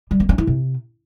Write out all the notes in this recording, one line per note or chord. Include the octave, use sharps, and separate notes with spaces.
G3
A#3
C#4
E4
C3